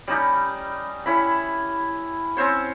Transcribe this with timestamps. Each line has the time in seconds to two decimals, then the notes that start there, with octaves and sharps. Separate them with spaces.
0.08 G3 C#4 D#4 G4
1.06 C#4 E4 B5
2.37 C4 C#4 C5 C#5